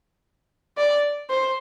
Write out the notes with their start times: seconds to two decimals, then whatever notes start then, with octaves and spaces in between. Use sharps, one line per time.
0.78 D5
1.30 C5